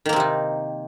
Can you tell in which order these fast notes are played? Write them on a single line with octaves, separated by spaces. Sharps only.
D#3 A#3 C4 C3 D#4